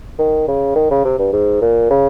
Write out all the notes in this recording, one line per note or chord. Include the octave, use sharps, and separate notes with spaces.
D#3
C#3
D#3
C#3
C3
G2
G#2
A#2
C#3